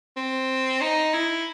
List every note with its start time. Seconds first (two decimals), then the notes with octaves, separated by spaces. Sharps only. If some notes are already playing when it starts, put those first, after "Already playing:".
0.17 C4
0.81 D#4
1.14 E4